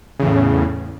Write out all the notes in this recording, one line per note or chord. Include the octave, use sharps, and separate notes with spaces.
E2 A2 C#3